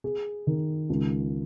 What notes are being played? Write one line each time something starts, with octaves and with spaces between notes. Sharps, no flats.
G#4
D#3
C#2